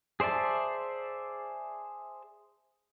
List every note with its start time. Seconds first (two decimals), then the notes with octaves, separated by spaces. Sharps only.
0.20 G#4 C5 D5 E5 A5